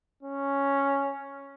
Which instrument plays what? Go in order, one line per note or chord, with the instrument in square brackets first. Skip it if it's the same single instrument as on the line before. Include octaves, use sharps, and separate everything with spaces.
[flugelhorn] C#4